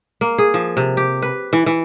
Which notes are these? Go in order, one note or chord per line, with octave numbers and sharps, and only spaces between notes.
A#3
G#4
F3
C3
G4
B4
E3
E3